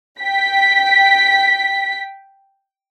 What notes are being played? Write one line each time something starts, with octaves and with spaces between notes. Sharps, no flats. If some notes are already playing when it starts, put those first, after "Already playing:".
G5 B6